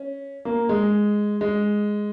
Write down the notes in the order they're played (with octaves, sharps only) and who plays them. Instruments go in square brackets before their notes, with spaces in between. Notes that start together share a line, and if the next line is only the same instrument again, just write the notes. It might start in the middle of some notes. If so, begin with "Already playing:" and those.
Already playing: [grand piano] C#4
A#3
G#3
G#3